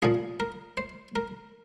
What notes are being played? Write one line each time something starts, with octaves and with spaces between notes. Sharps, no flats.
C2 A#2 F3 G#4
A#4
C5
A#4